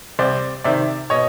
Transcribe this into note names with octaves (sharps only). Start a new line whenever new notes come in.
C2 C5 D5
C3 D#3 D5 E5
B2 C#5 D#5